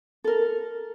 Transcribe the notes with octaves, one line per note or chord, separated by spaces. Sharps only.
A4 A#4